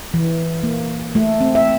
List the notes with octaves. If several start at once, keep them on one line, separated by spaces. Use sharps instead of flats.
E3
A#3
A3
C4
E5